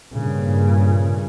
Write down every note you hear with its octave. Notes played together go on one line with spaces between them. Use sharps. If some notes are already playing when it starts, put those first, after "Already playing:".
G2 A#2 C#3